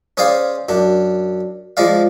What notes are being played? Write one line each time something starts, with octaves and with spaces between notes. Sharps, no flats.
C#4 G#4 C5 D5 F5
F#2 D4
F3 G#3 D5 F5